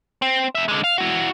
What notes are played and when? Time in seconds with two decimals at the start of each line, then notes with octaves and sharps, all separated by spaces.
0.22 C4
0.55 F2 E5
0.68 D3 G#3
0.84 F5
0.98 E4 F#4